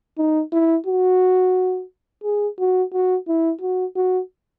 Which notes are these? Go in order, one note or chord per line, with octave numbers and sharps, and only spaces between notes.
D#4
E4
F#4
G#4
F#4
F#4
E4
F#4
F#4